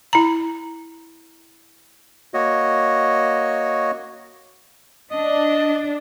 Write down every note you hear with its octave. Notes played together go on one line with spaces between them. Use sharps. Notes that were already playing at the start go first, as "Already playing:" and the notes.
E4 A#5
A#3 F#4 C#5 D#5
D4 D#5